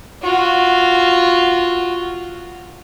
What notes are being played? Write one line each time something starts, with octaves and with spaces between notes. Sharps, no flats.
F4 F#4